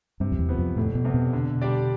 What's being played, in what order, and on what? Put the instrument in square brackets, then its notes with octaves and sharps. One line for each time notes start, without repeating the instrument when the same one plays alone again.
[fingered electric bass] G2 [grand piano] C3
[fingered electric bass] F2
E2
[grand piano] F3 B3
[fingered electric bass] F2
[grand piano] F1 [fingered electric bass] A2
[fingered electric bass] B2
[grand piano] E2 C3
[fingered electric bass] B2
[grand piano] D3
G3 D4 G4 D5